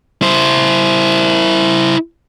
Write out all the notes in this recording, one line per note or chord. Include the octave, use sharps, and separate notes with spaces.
E4 C5